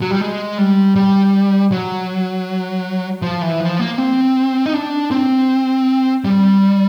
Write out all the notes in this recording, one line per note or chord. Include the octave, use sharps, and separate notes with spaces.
F#3
G3
G#3
G3
G3
F#3
F3
E3
F3
A#3
C4
D#4
D4
C4
G3